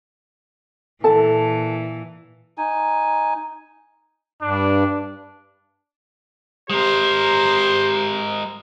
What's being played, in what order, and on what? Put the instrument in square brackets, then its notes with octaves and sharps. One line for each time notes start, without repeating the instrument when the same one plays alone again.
[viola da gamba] A#2 E3 [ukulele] A4 A5
[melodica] D#4 G#5
[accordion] G2 [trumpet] D4
[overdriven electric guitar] G#3 A#4 [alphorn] G4 [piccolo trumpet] C5